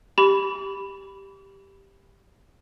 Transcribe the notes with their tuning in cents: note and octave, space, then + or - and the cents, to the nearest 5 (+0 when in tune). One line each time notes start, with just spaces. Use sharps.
G4 +0 B5 +0 D6 -45